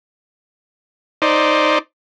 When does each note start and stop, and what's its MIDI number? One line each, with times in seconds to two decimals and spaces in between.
1.22 1.79 63
1.22 1.79 72
1.22 1.79 74